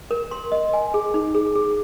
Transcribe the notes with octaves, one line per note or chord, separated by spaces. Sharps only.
A#4
C6
D#5
G#5
G#4
D#4
G#4
G#4